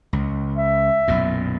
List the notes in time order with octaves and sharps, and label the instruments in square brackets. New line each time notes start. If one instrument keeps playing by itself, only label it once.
[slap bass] C#2
[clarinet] E5
[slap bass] B1 F#2 A#2